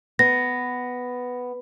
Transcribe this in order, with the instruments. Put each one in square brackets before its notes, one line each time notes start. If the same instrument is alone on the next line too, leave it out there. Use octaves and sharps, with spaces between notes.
[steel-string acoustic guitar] B3 [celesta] A#6